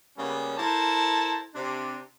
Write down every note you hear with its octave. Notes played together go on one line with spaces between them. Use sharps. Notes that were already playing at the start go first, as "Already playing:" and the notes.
C#3 G3 A#3 B3 C#4
E4 A4 A#4 C5 A5
C3 D4